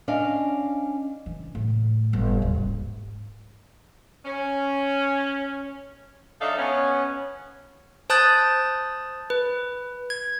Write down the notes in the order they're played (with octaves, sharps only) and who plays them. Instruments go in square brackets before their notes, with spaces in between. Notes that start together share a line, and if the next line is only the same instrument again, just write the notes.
[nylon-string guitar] C#4 D4 D5 D#5 F5
[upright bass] E3
A2
G1
D#1
G#2
[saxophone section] C#4
F#3 D4 D#4 A4 E5 F5
B3 C#4
[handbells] C5 A5 D#6 F#6 G6 A6
B4
G#6